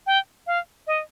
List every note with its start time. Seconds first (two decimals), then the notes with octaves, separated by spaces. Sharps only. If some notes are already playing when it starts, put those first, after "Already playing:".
0.07 G5
0.47 F5
0.87 D#5